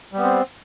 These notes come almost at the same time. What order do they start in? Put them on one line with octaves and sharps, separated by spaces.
G3 B3 C4